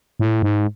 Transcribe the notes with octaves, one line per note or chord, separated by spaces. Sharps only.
A2
G#2